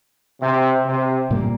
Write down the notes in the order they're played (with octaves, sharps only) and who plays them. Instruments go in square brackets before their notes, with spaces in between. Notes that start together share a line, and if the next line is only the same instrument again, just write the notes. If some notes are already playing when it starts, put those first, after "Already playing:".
[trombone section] C3
C3
[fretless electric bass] A#2 G3 A#3